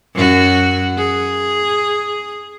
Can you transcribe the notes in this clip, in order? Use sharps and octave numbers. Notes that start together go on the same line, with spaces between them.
F#2 F#4
G#4